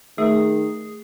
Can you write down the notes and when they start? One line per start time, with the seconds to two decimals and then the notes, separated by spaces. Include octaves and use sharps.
0.18 D#3 A3 G#4